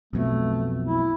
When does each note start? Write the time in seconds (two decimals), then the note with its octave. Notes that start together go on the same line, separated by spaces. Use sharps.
0.13 B1 F2 B2 A3
0.86 E4